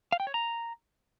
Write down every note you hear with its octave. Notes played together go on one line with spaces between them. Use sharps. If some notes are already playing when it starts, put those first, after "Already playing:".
F5
G5
C#5
A#5